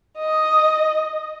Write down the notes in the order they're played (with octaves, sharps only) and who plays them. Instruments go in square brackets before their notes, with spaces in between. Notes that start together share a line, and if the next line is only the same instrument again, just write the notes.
[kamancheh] D#5